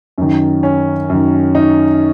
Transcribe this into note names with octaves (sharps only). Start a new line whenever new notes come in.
F#2 D#3
C#4
F#2 D#3
D#4